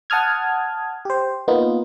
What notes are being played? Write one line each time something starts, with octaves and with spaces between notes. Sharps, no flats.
F#5 A5 D#6 F6 G#6
G4 C5
A#3 B3 D#4 F4